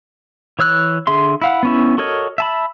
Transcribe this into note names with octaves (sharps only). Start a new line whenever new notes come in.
E3 C#5 E6 F#6
D3 G#4 E5 C6
E4 F5 F#5
B3 C#4 E4
F#4 A4 A#4 C#5 D#5
E5 A5 B5